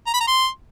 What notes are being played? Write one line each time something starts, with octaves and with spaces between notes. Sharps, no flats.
A#5
B5
A#5
C6